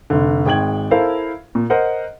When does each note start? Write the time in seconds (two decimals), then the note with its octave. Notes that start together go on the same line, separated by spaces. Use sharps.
0.10 F1 D3
0.46 G#1 G#3 G5 G#6 F#7
0.91 E4 A4 A#4 C5 F5
1.55 A#2
1.70 A#4 C5 D#5 F#5